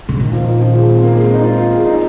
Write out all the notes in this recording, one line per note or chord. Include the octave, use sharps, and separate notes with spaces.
C3
A#2 D#3
F3
D#3
F3
G#3
C4
A#3
G#3
C4
D#4
F4
F4
G#4
D#4